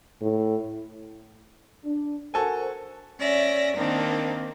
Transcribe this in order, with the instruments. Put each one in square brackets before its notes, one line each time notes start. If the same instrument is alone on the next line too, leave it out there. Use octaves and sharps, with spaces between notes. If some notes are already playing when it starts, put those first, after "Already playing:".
[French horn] A2
[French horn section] D4
[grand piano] F#4 A4 G#5 [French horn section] A#4 C5
[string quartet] C#4 D5 E5 A#6
D#3 A#3 C4 D4 D#4